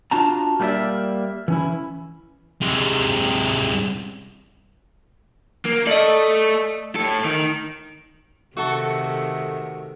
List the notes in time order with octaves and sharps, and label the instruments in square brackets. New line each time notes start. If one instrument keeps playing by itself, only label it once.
[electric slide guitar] D4 F4 F#4 A5 A#5
G3 A#3 C#4 G4 D5 E5
E3 C#4 E4
[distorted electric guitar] C3 G#3
[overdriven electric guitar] A#3
[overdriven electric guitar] A3 A4 [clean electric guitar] D5 D#5
[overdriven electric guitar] A2 A4
D#3
[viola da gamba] C3 D#3 [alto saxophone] A3 [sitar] F#4 A4